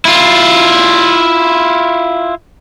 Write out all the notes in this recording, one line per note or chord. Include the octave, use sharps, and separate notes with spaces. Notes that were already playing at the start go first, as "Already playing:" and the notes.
E4 F4